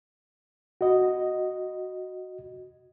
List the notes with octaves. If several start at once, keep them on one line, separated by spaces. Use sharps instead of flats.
F#4 D#5